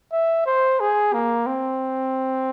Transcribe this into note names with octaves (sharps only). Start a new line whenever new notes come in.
E5
C5
G#4
A#3
C4